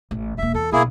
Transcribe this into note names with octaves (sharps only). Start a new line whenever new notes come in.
A1
E1 A#3 E5
E2 A4
B1 A#3 E4 G#4